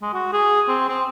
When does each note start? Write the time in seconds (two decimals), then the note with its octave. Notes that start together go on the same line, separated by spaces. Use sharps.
0.02 G#3
0.14 F#4
0.33 G#4
0.68 C4
0.89 C4